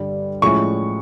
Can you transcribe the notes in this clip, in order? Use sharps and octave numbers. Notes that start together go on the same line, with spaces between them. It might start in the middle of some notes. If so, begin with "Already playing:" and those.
Already playing: G2 D3 G3
A2 F3 G#3 C#4 E4 C#6